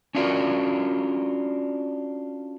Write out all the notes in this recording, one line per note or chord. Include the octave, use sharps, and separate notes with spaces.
C#4 D4 F4 F#4 A#4